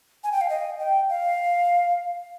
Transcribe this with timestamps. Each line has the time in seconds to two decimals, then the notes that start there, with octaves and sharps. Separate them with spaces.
0.24 G#5
0.32 G5
0.41 F5
0.50 D#5
0.80 G5
1.10 F5